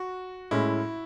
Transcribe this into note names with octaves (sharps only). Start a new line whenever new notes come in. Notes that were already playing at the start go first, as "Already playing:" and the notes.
Already playing: F#4
A2 G#3 C#4 E4